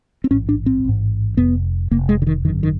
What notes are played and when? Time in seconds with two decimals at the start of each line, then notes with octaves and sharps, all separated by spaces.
0.24 C4
0.31 A1 G#2 C#4
0.49 D4
0.66 C4
0.84 A1 G#2
1.37 F1 F2 C3 B3
1.91 F1 F2 C3 A#3
2.09 G#3
2.22 D3
2.27 D#3
2.45 G#1 F#2 D3 D#3
2.63 D#3